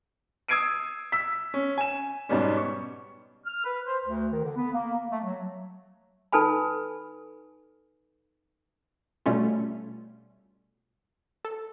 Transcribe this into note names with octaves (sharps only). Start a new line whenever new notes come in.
D#6 E6 G#6 C7 D7 D#7
E6 B6
C#4
G#5 E7
G#2 B2 G3 C#4
C#6
F6
B4
C5
D2
D#3
D3
B3
A#3
A3
F#3
D#4 A4 B4 G#5 B5
B2 G3 A3 C#4 F4
A4